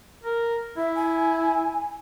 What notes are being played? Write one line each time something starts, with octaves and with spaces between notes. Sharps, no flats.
A#4
E4 E5
G#5